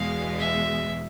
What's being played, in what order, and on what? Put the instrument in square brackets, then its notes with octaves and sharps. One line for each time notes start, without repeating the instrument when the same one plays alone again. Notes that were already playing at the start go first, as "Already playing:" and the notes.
Already playing: [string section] E2 B2 G#3 [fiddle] F5
[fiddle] E5